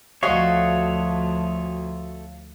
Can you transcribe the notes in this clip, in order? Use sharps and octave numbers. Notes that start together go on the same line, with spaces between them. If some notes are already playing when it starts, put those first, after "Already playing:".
D2 F3 A3 F#4 C#5 D#5 F5 C#6